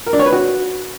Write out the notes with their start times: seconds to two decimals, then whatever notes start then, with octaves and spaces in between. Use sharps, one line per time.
0.06 A#4
0.13 D4
0.20 C#5
0.26 B4
0.33 F#4